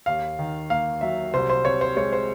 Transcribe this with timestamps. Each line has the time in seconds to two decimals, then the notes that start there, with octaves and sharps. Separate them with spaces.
0.06 D#2 F5
0.39 D#3
0.70 A#3 F5
1.01 F#3 E5
1.34 C2 C5
1.50 C5
1.65 C3 C#5
1.81 C5
1.96 G#3 C#5
2.13 C5